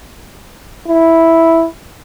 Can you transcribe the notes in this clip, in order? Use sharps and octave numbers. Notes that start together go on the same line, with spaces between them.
E4